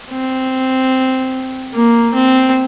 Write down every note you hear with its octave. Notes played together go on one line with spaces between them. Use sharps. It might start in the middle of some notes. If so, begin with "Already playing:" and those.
C4
A#3
C4